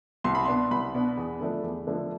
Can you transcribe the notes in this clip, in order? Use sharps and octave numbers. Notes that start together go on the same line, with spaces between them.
C2 C6
B5
B2 B3 D4 C6
C2 B5
B2 B3 D4
E2
D3 F3 A3 D4
E2
D3 F3 A3 D4